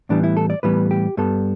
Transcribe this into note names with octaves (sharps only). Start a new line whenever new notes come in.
A2 E3 G3 B3 D4
E4
A4
D5
A2 E3 G3 B3 B4
G4
G2 G3 B3 A4